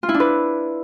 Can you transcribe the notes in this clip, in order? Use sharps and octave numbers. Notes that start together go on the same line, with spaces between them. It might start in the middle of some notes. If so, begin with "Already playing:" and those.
F4
E4
D4
B4